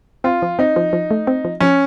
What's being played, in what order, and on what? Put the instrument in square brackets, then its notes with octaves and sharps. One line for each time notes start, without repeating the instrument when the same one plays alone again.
[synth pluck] C4 [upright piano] F4
[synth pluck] F3
[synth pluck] C4 [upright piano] D#4
[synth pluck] F3
F3
A3
C4
F3
[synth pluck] F3 [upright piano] C#4